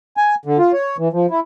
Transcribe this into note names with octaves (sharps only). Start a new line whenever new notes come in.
G#5
D3
F4
C#5
E3
F3
E4